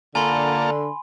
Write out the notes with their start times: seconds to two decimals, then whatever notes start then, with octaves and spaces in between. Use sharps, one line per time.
0.15 D3 A#3 F4 A4 G#5 B5 C6